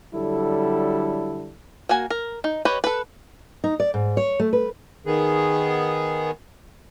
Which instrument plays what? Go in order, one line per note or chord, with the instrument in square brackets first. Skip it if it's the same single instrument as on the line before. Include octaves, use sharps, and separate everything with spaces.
[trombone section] D3 F#3 G3 E4 A4
[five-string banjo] A#3 F#4 G#5
A#4
D#4
G4 B4 C#5 D#5
A4 B4
[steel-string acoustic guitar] D#4
D5
G#2
C#5
A3
B4
[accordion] D#3 B3 G#4